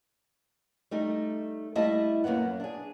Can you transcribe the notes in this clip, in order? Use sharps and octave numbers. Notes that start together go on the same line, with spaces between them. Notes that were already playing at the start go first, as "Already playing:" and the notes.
G3 A3 D#4
G3 A3 E4 D#5 E5 A5
F#2 E3 A#3 B3 F#5
D4 G#4